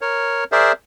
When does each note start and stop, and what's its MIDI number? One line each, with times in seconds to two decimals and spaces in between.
0.01 0.44 70
0.01 0.44 73
0.52 0.72 68
0.52 0.72 70
0.52 0.72 72
0.52 0.72 74
0.52 0.72 76